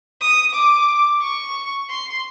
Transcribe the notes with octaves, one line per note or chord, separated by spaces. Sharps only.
D#6
D6
C#6
C6